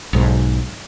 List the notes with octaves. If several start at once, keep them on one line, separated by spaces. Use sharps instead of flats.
B1 G#2